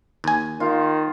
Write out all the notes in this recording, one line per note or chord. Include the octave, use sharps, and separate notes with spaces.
D#2 G#5
D#3 F4